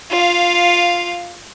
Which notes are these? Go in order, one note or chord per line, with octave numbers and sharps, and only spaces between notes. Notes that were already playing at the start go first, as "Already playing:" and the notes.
F4 F5